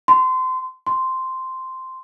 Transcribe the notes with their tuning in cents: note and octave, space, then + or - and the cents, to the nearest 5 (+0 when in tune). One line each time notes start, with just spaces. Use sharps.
C6 -25
C6 -5